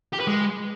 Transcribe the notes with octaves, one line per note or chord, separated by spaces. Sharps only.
G4
B4
G#3